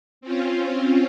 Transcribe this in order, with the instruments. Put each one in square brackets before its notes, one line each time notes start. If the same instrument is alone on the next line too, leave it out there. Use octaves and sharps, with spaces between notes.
[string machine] C4 C#4 F4